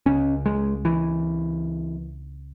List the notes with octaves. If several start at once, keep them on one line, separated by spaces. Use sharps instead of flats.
C#2 C#3 C#4
G#3
E3